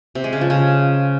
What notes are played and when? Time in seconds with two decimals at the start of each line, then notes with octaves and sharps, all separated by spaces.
0.15 C3
0.24 G#3
0.33 C#3
0.41 F3
0.50 C#3